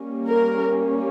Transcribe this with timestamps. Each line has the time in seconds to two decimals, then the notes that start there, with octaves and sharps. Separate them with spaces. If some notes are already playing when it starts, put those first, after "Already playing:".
Already playing: G3 A#3 C#4
0.28 A#4